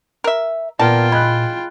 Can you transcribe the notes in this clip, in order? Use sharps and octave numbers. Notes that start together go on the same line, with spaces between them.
A#4 E5
A#2 B3 F4 A#4 D5 G5 A5
G#3 B5 F#6